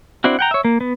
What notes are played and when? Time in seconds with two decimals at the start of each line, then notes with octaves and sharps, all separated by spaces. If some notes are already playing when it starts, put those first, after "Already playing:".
0.24 C4 D4 E4 F#4
0.39 F#5 G5 A#5
0.51 C#5 E5
0.65 A#3
0.81 B3